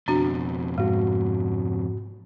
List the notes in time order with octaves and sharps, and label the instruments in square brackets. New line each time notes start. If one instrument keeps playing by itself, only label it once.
[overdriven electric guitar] F2 B2 [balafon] D4 F#4
[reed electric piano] G#2 F#4 [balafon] G#3